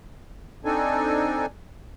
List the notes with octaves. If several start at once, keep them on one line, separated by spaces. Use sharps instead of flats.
C4 D4 D#4 A4 G#5